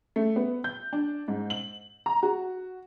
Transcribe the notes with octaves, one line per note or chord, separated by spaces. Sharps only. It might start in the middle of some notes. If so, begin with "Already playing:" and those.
A3
B3
G6
D4
G#2
F#7
A#5
F#4